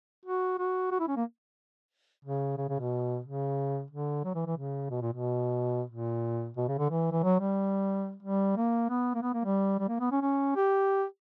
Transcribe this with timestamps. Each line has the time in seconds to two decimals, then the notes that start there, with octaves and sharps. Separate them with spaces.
0.26 F#4
0.59 F#4
0.91 F#4
1.00 E4
1.08 C#4
1.16 A#3
2.25 C#3
2.58 C#3
2.69 C#3
2.80 B2
3.25 C#3
3.91 D3
4.24 F#3
4.35 E3
4.47 E3
4.57 C#3
4.91 B2
5.02 A#2
5.13 B2
5.90 A#2
6.57 B2
6.68 C#3
6.79 D3
6.90 E3
7.12 E3
7.23 F#3
7.40 G3
8.23 G3
8.57 A#3
8.90 B3
9.15 A#3
9.23 B3
9.34 A#3
9.45 G3
9.80 G3
9.89 A#3
10.00 B3
10.12 C#4
10.22 C#4
10.56 G4